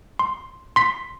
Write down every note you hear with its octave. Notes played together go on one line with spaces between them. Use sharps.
C6
C6 B6